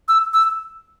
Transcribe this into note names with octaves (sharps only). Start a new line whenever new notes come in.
E6
E6